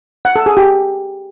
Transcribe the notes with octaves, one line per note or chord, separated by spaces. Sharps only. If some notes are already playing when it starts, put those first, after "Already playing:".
F#5
A4
G#4
G4